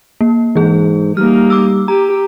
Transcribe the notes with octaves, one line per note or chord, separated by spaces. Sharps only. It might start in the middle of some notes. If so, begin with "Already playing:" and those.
A#3
G#2 E3 G#4
G3 A#3 D#4 F6
D6 E6
G4 A#5